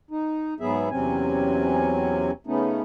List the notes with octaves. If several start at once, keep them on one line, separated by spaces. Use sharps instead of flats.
D#4
G#2 F#3 B3 G#4 E5
E2 C3 F#3 C4 C#4 G#5
C#3 A3 B3 C#4 D#4